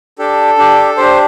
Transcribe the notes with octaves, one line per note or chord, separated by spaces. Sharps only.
D4 G4 A4
D4 G4
D4 G4 C5